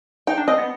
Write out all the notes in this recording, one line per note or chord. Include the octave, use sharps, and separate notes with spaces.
D#4 G5
D4
C4 D#5
B3